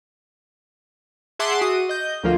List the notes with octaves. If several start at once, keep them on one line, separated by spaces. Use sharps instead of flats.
G#4 E5 F#5 A5 C6 D6
F#4 D#6
D#5 G6
D2 F3 A#3 F4